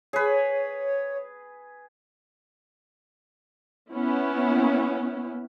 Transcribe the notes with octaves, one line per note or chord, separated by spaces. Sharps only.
G#4 B4 C#5
B3 C#4 E4